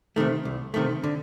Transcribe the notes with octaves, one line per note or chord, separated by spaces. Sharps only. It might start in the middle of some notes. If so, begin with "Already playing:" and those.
C3 D#3 A3
C2
C3 D#3 A3
D3